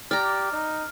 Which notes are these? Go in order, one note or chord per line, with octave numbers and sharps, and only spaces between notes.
G4 D5 A#5 F6
D#4